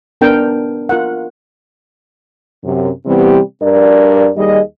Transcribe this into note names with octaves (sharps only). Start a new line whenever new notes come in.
B3 D4 A#4 G5
F4 A#4 F#5
F#2 C3
C3 E3 G3 B3 G4
G2 A#4 D5
D#2 G3 G#4 D#5